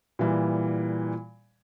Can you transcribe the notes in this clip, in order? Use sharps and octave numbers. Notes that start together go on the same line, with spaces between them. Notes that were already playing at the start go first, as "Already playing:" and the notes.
A#2 E3 G3